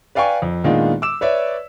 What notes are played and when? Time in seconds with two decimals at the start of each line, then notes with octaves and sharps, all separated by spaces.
0.15 B4 D5 F5 G5 G#5 C#6
0.42 F2
0.64 A#2 D#3 G#3 B3 D4 F4
1.02 D6 E6 E7
1.21 B4 C#5 D5 E5